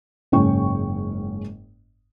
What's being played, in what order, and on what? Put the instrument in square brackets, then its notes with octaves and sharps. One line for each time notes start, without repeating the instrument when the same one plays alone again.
[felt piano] F#1 G#2 C#4 G5 C#6